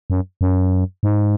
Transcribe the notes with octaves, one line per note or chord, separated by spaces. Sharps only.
F#2
F#2
G#2